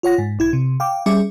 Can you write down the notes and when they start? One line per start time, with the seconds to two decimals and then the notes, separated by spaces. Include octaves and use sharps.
0.03 F4 C#5 F#5 A#6
0.18 G#2
0.39 B1 E4 G#6
0.53 C3
0.80 F5 G5 D6
1.06 G3 C#4 G#4 E5 D6 C#7